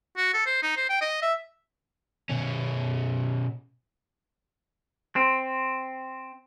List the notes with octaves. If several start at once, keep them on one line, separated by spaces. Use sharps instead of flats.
F#4
A4
C5
D#4
C5
G5
D#5
E5
B2 C#4
C4